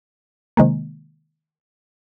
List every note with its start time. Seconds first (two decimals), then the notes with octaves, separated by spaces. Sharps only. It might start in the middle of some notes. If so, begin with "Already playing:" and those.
0.57 C3 D#3 G#3 A#3